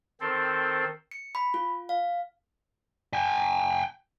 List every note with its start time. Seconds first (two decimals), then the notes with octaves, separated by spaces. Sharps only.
0.21 D#3 C4 A4 C5
1.11 C#7
1.35 B5
1.54 F4
1.89 F5
3.13 G5 G#5